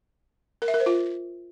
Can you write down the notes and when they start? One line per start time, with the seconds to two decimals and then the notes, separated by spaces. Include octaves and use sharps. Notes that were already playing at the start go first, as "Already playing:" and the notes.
0.62 A#4
0.68 E5
0.74 A#4
0.80 C5
0.86 F4